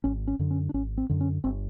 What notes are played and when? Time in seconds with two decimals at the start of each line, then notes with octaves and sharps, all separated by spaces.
0.04 G#1 C#4
0.27 C#4
0.39 F#2 D3
0.51 C#4
0.69 D4
0.74 G#1 C#4
0.98 C4
1.09 F#2 D3
1.21 C#4
1.44 G1 C4